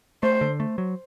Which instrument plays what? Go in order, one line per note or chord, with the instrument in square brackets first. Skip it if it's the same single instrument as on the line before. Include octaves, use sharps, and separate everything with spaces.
[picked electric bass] A3 [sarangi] C5
[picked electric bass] D3
A3
F#3